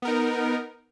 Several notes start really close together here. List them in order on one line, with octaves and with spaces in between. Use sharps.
B3 A#4 D#4